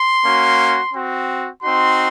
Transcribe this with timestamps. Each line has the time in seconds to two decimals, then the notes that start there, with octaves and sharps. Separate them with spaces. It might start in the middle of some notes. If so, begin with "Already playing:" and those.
Already playing: C6
0.24 A#3 C#4 F#4
0.94 C4 F#4
1.63 C4 D#4 F#4 C6